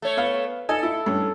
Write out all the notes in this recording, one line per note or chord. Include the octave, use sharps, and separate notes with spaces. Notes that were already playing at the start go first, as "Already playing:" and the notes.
A3 C#5
B3 F5
D#4 A4 G#5
E4
G2 C#4